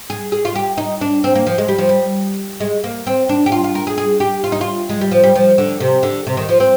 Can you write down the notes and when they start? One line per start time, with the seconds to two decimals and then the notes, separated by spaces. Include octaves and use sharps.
0.10 G#4
0.32 G#4
0.45 F4
0.56 G4
0.78 D#4
1.01 D4
1.24 C4
1.35 A#3
1.47 F3
1.58 G#3
1.68 G3
1.78 F3
1.89 G3
2.60 G#3
2.84 A#3
3.07 C4
3.29 D4
3.46 G4
3.52 F4
3.64 F4
3.75 A#4
3.87 G#4
3.98 G#4
4.20 G4
4.44 F4
4.52 D#4
4.61 F4
4.89 G#3
5.01 G3
5.12 F3
5.24 G3
5.35 F3
5.58 D3
5.80 C3
6.03 D3
6.27 C3
6.37 D#3
6.49 F3
6.60 C4